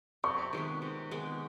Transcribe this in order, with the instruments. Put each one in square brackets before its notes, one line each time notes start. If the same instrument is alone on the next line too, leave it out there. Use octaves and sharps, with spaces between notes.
[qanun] C3 [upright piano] C#6
[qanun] D#3 G#3 B3
C3
D#3 G#3 B3